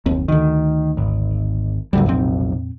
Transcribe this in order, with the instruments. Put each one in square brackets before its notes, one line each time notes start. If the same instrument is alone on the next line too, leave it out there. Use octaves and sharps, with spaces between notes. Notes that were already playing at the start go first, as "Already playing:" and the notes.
[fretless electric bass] F#1 D#2 C4
[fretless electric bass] D2 D3 [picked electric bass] D#3
[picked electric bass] G#1
[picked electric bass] F1 B1 [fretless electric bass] A#2 D3 G3
[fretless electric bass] F2 A#2 C4